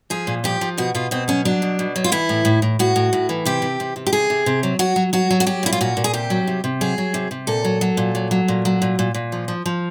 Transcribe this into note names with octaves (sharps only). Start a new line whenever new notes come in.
F3 G#4
A#2
F3 G4
F3
B2 F#4
B2 F4
B2 C4
F#3 C#4
F#3 D4
B2
B2
F#3
F4
E3 E4
A2
A2
A2
A2 F#4
A2
A2
E3
C3 G4
C3
C3
C3
G4
C3 G#4
C3
C3
F#3
F#3 F#4
F#3
F#3 F#4
F#3
F#4
F#3 G4
A#2 E4
F4
A#2 F#4
A#2
G#4
C3 G4
F#3
C3
C3
F#3 G#4
F#3
C3
C3
A#2 A4
F#3
F#3
A#2
F#3
F#3
A#2
F#3
A#2
A#2
A#2
F3
F3
F3